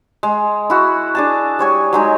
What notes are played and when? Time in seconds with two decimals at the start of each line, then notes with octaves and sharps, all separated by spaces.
0.23 G#3
0.70 E4 F#4
1.15 D4 G#4 A5
1.59 G3 C#5 G#5
1.93 F#3 G#3 D#4